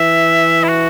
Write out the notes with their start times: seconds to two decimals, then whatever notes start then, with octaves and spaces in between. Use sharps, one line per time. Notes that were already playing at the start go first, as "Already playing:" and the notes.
Already playing: E3 E5
0.64 E4
0.69 F#4